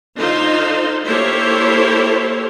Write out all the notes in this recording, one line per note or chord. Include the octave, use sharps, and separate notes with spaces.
D3 D#4 F4 C5
A#3 E4 G4 A4 C5 C#5